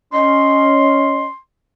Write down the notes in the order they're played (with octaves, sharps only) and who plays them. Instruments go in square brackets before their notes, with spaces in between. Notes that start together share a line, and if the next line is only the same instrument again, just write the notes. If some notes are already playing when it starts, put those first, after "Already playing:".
[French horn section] C#4 [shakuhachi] D#5 [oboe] C6